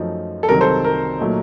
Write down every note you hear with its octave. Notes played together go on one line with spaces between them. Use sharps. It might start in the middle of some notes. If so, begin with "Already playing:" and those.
Already playing: F#2 F3 A3 D#4
A4
C2 C3 D#3 F#3 A#4
A4 C5
A#4
A#2 F#3 A3 D#4